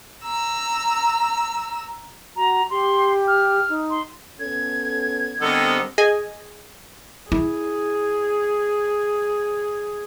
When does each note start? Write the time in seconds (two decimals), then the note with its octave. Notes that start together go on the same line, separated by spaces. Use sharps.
0.23 A#5 E6
2.36 F#4 A#5
2.70 G4 C6
3.28 F6
3.69 D#4
3.90 C6
4.39 B3 C#4 A4 G#6
5.41 D3 G3 B3 C4 A4 A#4 D#5
5.98 G#4 D#5 G#5
7.32 E4 G#4